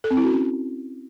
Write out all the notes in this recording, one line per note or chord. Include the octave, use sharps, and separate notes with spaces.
A4
C4
E4
F#4
C#4